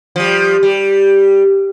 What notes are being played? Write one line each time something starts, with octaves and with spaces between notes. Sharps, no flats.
F3 G3
G3